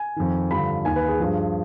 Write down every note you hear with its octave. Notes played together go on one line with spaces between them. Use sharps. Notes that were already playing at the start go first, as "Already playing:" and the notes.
Already playing: G#5
F2 D#3
G2 D3 F3 B5
D#2 D#3 G#5
B4
G#4
G2 F3 G#4